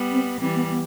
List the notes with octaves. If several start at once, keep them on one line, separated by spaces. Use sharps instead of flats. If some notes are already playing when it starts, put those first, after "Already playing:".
Already playing: G3 B3
C4
E3 G3 C4
B3
B3